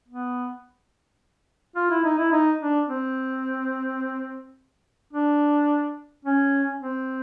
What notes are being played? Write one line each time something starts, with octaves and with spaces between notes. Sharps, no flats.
B3
F4
E4
D#4
E4
D#4
D4
C4
D4
C#4
C4